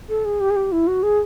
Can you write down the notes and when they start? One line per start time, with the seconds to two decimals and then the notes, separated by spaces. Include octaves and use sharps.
0.09 A4
0.25 G#4
0.40 G4
0.50 G#4
0.56 G4
0.72 E4
0.87 F#4
1.03 G#4